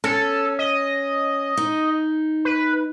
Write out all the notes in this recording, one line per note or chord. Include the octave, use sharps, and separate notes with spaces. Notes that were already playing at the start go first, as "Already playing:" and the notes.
C#4 A4
D#5
D#4
B4